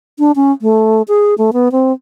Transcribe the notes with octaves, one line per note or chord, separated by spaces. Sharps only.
D4
C#4
A3
G#4
A3
B3
C4